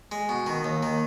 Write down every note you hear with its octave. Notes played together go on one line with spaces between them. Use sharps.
G#3
B2
D#3
D#2
D#3